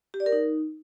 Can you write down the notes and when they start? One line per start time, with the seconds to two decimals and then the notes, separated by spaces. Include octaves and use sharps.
0.14 G4
0.20 D5
0.26 A#4
0.32 D#4